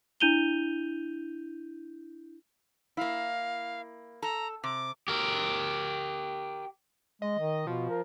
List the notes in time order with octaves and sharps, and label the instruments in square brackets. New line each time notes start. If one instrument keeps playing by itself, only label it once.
[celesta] D4 E4 G6 D#7 F7 G7
[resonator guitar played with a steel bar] A#3 E4 [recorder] F5
[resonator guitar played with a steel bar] A4 [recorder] A#5
[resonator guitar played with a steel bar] C3 [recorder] D6
[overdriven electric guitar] G4 A#4
[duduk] G#3 [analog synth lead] D#5
[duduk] D#3
[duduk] B2 [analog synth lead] F3
[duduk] A#4